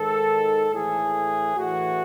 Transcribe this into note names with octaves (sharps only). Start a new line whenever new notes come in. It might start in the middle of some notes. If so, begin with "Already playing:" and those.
Already playing: G#2 D#3 A4
A2 E3 G#4
A2 E3 F#4